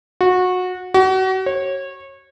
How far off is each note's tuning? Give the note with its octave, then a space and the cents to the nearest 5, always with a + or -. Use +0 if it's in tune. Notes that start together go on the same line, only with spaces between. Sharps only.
F#4 -20
F#4 +35
C#5 -25